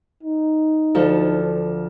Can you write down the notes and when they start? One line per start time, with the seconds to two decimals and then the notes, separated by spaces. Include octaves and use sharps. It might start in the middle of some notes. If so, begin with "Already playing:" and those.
0.23 D#4
0.95 D2 F3 A4